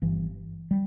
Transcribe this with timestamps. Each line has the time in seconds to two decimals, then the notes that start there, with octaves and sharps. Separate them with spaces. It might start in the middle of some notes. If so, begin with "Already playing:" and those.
0.02 G1 G2 E3
0.71 G3